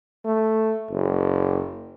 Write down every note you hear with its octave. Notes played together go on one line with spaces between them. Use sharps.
A3
F#1